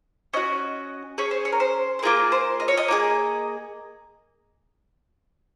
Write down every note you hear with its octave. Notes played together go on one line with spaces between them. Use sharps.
C#4 F#4 D#5
C#4 G#4 C#5
C5
C#5
A#4
C5
C5
A#3 F4 G#4 A#4
C5
D#5
C#5
D#5
A#3 F4 G#4